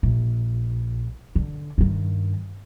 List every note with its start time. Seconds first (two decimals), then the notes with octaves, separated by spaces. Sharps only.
0.03 A#1
1.35 D3
1.78 G2 D#3